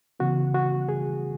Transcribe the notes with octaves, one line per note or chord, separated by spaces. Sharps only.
C#3 E3 B3 F#4
F#4
G#4